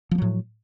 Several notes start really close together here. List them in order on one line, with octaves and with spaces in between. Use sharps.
F3 A#3 F#3 A2